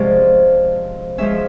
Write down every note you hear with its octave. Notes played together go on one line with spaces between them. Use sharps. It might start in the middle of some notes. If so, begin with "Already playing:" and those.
Already playing: C3 F3 G#3 C#4 D5
F3 G#3 C#4 E5